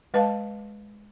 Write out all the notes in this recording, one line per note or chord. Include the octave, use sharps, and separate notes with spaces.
G#3 B4 D#5 F5 A5